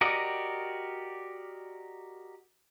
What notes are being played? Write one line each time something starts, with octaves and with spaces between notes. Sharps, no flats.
F#4 G4 A#4 D5 D#5